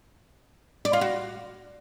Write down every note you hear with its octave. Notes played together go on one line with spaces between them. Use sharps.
D5
F4
F#4